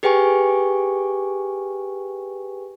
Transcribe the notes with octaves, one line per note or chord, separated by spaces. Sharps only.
G4 G#4 B4 G5 G#5 C#6